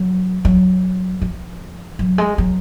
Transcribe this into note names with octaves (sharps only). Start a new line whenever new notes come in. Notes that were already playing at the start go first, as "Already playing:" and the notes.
Already playing: F#3
F#3
F3
F#3
G#3
F#3